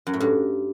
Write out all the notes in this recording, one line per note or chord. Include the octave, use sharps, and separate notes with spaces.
F#2
A2
G2